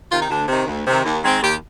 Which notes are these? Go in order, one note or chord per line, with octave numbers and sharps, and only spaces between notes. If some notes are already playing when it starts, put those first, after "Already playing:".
C3 D#3 F4
D#4
D2 D4
C3 D#3
D2
C3 D#3
D#2
D#3 G#3 C4
D#2 G4